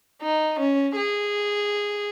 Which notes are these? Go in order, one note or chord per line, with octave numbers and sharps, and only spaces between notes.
D#4
C#4
G#4